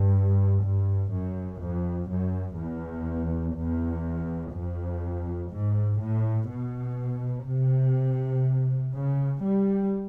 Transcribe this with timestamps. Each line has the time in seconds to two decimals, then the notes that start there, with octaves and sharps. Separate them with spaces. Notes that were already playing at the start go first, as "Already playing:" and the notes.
Already playing: G2
0.64 G2
1.12 F#2
1.62 F2
2.10 F#2
2.59 E2
3.56 E2
4.54 F2
5.52 G#2
6.01 A2
6.50 B2
7.47 C3
8.94 C#3
9.43 G3